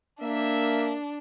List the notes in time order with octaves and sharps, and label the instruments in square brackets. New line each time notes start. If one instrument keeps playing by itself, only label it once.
[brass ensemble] A#3 E5 [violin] D4